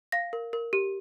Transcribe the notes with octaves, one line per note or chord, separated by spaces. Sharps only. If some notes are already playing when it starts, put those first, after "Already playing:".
F5 A#6
A#4
A#4
G4